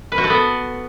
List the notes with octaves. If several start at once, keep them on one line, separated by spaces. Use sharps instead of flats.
B4
F#4
A4
B3